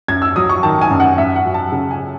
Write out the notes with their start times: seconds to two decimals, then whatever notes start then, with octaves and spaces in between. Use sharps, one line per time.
0.08 F#2 G#6
0.22 E6
0.36 F#3 D#6
0.49 C#6
0.63 D#3 A5
0.81 G#5
0.90 F#2
1.00 F#5
1.18 F#2 E5
1.36 F#5
1.45 F#3
1.54 A5
1.72 C#3
1.91 G#5